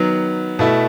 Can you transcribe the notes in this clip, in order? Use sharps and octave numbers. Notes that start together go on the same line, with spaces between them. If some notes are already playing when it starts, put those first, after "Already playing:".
Already playing: D#3 F#3 B3
B2 A3 E4